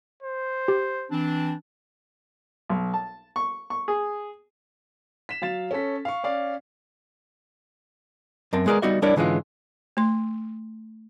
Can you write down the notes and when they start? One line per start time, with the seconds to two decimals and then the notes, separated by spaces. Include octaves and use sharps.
0.23 C5
0.68 G4
1.10 E3 C4 D4
2.69 B1
2.94 A5
3.36 C#6
3.70 C#6
3.88 G#4
5.29 B6 E7
5.42 F#3 F5 A6 E7
5.71 C#4 A4 B6
6.05 F5 C#6
6.24 C#4 D5 F5
8.53 F#2 C4 A#4 A5
8.66 G#3 B3 G#4 A#4 D5
8.82 G3 B3 D#4 F#4 D5 E5
9.02 G3 D4 E4 A#4 C#5 D5
9.16 G#2 D3 E3 G#3 C#4 F4
9.97 A3 C6